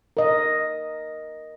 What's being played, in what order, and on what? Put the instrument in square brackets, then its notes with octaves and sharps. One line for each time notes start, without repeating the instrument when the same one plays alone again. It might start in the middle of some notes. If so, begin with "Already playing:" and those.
[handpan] A#4 D#5